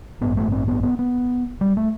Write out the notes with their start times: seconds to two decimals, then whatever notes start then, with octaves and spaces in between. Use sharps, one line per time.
0.21 A1 G2 B3
0.37 A3
0.52 C4
0.68 B3
0.83 B3
0.99 B3
1.61 G3
1.77 A3